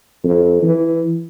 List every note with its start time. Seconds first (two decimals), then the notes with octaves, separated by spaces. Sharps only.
0.24 F2
0.62 E3